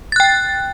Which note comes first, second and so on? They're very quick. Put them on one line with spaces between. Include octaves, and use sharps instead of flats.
A6 F#6 G5